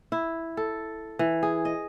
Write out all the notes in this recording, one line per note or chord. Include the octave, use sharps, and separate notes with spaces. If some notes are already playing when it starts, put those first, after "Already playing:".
E4
A4
E3
G#4
D#5